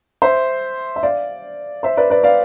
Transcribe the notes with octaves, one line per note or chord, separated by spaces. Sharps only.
C5 E5
E5
D5 F5
C5 E5
B4 D5
B4 D5
D5 F5